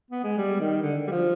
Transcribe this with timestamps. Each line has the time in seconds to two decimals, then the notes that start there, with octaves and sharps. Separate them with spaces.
0.11 B3
0.24 G#3
0.38 G3
0.60 D#3
0.82 D3
1.07 G3
1.11 F3